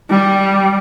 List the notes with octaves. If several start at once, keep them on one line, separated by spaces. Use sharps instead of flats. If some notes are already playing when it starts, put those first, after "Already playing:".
G3